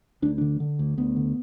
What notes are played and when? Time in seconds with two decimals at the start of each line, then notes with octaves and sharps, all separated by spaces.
0.22 D2 D4
0.38 D3 D4
0.60 D3
0.79 D2
0.98 D2 B3
1.16 D3